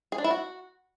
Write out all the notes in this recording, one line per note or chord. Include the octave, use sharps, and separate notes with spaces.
G#4
D4
E4
F#4